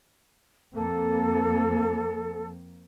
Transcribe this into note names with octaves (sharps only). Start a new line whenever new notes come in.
F2 A#3 C4 A4